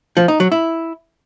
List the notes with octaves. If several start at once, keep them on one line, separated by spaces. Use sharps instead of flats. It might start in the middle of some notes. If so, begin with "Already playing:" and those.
F3
D#4
F#3
E4